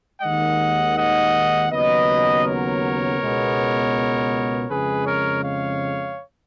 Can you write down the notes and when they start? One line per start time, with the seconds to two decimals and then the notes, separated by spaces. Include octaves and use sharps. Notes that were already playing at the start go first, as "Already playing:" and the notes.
0.22 D#2 D#3 G#3 D#5 F#5
0.97 D#5 F#5
1.70 D#2 C#3 F#3 B3 B4 D#5
2.45 A#4 C#5
3.19 C#2 B2 G#3 B3
4.69 F2 C#3 G#3 G#4 B4
5.06 A#4 C#5
5.43 C#5 F5